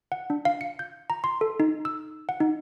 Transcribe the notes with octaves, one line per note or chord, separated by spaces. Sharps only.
F#5
D4
F5
C#7
G6
A#5
C6
A4
D#4
E6
F#5
D#4